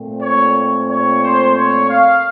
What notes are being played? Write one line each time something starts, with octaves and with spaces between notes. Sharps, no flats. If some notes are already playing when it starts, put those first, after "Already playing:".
Already playing: A#2 A3 C4
C#5
C#5
C5
C#5
F5